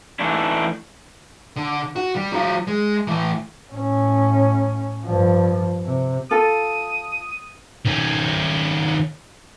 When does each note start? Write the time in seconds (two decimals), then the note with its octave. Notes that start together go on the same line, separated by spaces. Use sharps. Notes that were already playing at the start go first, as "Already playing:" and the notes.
0.19 E3 A3 D4 D#4
1.56 D3
1.96 F#4
2.16 G3
2.33 F#3 F4
2.67 G#3
3.07 E3 A3
3.72 A2 C#4
5.05 G2 F3
5.84 C3
6.31 F4 A4 D#6
7.85 D#3 C#4